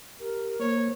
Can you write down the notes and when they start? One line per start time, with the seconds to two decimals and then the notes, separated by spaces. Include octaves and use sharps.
0.20 G4 A#4
0.60 A#3 C5 C#5